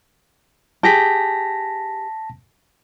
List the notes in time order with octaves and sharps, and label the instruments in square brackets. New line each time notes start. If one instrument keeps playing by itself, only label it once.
[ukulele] G4 G#4 [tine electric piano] A5 A#6 B6